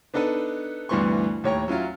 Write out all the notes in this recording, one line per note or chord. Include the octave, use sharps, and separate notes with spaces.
B3 D4 D#4 A4 B4
D2 G2 E3 B3 C6 C#6
D#2 A2 C#5 G5 A#5 C#6
F#3 C#4 E4 F4